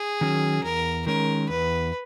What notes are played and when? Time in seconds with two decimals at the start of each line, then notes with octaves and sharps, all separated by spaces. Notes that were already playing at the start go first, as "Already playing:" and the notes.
Already playing: G#4
0.21 D#3 F#3 C#4
0.63 E2 A#4
1.06 D#3 G#3 C#4 A#4
1.49 E2 B4